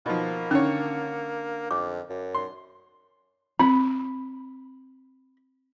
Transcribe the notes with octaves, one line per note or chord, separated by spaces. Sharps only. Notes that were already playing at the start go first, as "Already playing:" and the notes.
B2 D#3 F3 A#3
D3 D#3 C#4 C#5
F2 D6
F#2
C6
C4 B5